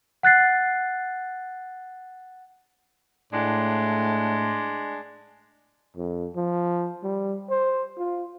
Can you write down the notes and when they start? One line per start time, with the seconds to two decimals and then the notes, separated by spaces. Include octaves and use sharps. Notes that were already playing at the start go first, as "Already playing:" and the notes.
0.23 F#5 F#6 A6 C7
3.33 A2 G#3 D4
5.97 F2
6.35 F3
7.03 G3
7.50 C5
7.98 F4